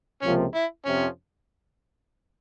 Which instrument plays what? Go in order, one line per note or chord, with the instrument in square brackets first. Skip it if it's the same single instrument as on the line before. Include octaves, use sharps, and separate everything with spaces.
[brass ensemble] C#2 C3 F3 A#3 [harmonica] C#4
[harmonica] E4
[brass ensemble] F2 C3 F3 [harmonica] C#4